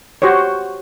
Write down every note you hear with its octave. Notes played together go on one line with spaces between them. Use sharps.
F#4 G4 C5 C#5